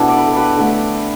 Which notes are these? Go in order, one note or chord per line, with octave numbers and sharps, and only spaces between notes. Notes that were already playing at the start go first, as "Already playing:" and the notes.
Already playing: B2 B3 D4 E4 G4 A4
D5
B4
A4
G4 B4
D3 A3